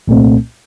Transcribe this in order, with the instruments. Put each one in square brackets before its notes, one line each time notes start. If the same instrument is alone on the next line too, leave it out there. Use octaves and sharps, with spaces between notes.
[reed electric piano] C2 A#2 A3 C4